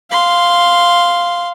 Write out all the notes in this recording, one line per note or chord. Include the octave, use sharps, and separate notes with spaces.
F5 C6